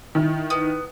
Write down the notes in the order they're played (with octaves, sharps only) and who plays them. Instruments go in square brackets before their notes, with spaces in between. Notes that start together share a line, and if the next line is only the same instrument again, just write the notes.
[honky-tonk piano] D#3 E4
[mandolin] B3